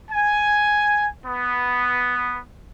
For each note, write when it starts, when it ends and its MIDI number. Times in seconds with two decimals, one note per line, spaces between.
0.11 1.06 80
1.26 2.39 59